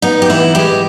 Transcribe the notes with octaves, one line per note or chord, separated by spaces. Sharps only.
B3 D#4
G4
E3 E4
G#3 G4